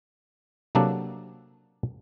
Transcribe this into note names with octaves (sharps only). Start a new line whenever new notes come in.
C3 F#3 A#3 D4 A4 F#5